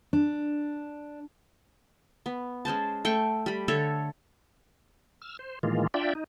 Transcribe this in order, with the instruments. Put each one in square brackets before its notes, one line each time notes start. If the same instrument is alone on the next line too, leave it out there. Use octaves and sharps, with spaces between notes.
[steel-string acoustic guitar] D4
[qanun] B3
G#3 C#4 C5 A5
A3 G5 C6 C#6
G3 B5
D3 A4 C#5 E5
[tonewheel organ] E6 F6
C5
A2 D#3 E3 G#3 A#3 F4
D4 F4 D5 E5 G5
D#4